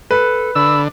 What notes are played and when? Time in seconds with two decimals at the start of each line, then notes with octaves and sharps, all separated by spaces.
0.11 A4 B4
0.55 D3 B5 E6